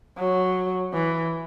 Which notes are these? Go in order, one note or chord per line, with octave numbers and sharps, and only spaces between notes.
F#3
E3